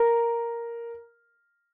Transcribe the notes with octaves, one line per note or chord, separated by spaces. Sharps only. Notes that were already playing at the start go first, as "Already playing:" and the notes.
Already playing: A#4